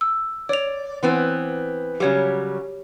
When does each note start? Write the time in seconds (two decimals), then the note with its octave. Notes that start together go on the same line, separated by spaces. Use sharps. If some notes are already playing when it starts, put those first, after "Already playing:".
0.01 E6
0.49 C#5 D5 F7
1.03 E3 B3 C4
2.00 C#3 F#3 G3 G4 C#5